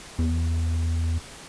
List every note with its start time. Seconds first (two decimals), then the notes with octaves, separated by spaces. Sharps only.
0.19 E2